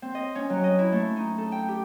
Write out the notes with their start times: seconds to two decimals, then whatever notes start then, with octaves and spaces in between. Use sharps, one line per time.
0.02 C4
0.15 D#5
0.35 C#4
0.50 F#3
0.64 D#5
0.79 E4
0.92 A3
1.17 D#4
1.38 A4
1.52 G5
1.69 G4